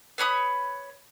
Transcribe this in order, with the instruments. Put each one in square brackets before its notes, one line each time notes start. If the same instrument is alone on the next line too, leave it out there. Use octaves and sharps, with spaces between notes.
[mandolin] B4 C#5 B5 D#6